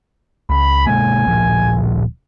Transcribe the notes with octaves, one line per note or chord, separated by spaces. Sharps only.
C#2 B5
B2 G#3 A#3 G#5
D1 A#2 F3